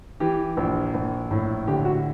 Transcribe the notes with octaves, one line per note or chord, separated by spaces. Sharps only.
E3 G4
A#1
A#1
A2
D3 G4
F#4